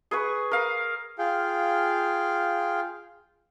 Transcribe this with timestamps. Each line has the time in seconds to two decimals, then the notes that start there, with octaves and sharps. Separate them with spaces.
0.11 G#4 B4 C#6
0.51 A#4 F5
1.19 F4 G#4 F5 G5